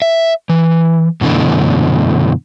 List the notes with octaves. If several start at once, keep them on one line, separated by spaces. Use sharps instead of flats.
E5
E3
F#2 B2 D3 E3 A3